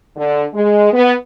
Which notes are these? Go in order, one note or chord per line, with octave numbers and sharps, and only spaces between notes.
D3
G#3
B3